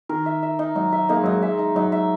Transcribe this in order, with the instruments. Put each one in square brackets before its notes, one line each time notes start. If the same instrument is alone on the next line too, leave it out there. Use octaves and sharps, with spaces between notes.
[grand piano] D#3 [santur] A#4
[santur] E5
E5
D#4
[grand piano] F#3 [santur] D#4
[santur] E5
[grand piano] A#3 [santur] D#4
[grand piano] G#3
[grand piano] F#3 [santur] D#4
[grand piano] G#3
[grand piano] G#3 [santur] E5
[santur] D#4
[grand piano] F#3 [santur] D#4
[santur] E5